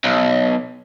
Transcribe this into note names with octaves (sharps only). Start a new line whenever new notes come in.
B1